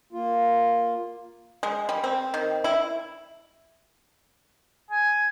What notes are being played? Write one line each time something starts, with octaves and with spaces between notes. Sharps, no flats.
A#3 F4
G#3
G3
C4
D#3
E4
G#5